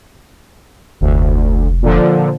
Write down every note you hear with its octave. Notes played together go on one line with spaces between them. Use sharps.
F1 D2
A#2 D3 F3